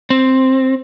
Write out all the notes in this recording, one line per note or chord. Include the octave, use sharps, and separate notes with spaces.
C4